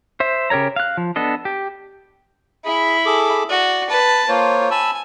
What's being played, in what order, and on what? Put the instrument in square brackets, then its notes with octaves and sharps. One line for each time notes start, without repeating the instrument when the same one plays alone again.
[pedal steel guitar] C5 E5
C#3 G4 A#4 C#5 A#5
F5 F#6
F3
B3 D4 A4 D#5
G4
[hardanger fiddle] E4 B5 [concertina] G#4
[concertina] G#4 A4 D6
[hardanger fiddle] F#4 [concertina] D5
[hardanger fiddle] B4 A5
[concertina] A#3 C5 C#5 [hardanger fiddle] F4
[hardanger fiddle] G#5 [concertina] A5 B5 E6